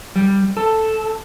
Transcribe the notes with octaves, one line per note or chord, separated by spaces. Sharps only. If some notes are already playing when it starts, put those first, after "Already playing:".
G3
A4